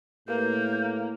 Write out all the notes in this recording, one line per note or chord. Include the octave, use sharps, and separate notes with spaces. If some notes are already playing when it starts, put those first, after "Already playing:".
A2 A#3 G4 A#4 B4 G6